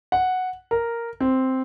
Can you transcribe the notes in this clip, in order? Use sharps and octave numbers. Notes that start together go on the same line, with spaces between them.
F#5
A#4
C4